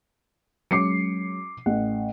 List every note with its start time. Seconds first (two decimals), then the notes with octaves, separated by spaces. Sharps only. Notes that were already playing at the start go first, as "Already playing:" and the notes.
0.71 F#3 G#3 C#4 D6 C7 C#7
1.66 A1 F#5